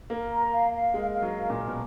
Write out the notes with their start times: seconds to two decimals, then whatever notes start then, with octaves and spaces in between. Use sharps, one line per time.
0.10 A#3 A#4
0.31 A#5
0.52 F5
0.72 F5
0.94 G#3 A#4
1.15 F5
1.22 F#3
1.36 A#4
1.50 A#2
1.56 A#4
1.67 B2